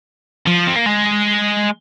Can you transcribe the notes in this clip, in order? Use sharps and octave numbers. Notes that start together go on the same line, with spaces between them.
F3
C4
A#3
G#3